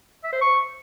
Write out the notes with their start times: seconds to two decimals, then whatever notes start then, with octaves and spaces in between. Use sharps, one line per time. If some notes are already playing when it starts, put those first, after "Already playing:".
0.24 E5
0.33 C5
0.41 C#6